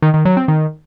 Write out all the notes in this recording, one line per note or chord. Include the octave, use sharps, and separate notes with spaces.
D#3
D#3
F#3
C4
D#3